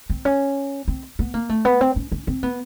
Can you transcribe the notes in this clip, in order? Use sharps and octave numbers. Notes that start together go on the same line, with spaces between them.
C4
C#4
C4
B3
A#3
A3
B3
C4
C#4
C#4
C4
B3